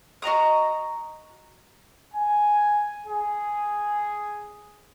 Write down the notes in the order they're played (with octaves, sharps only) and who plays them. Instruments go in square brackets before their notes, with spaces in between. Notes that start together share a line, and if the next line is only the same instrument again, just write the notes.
[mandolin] F#4 D#5 A#5 D#6
[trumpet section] G#5
G#4